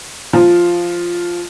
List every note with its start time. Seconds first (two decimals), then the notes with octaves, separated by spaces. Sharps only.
0.33 F3